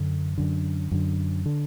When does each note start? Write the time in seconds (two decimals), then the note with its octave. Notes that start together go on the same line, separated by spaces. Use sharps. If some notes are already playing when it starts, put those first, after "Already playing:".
Already playing: F#2 D3
0.38 F#2 D3
0.92 F#2 D3
1.46 D3